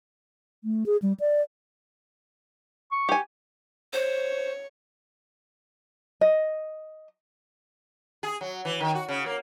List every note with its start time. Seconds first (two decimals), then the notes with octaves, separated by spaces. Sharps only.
0.64 A3
0.86 G#4
1.02 G3
1.20 D5
2.92 C#6
3.09 G4 G#5
3.93 C5 C#5
6.21 D#5
8.23 G#4
8.41 F#3
8.65 E3
8.80 D#3
8.95 F#4
9.08 C#3
9.26 A#3